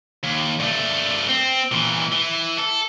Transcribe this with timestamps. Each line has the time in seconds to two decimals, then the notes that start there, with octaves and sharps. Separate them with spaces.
0.23 D#2
0.59 G2 A3
1.29 C4
1.72 A#2 E3
2.12 E3
2.58 A4